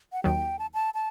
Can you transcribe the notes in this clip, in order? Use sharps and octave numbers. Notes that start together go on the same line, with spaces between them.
F#5
D#2 D#3 F#3 G5
A5
A5
A5